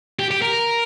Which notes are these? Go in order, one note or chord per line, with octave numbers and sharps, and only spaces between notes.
G4
G4
A#4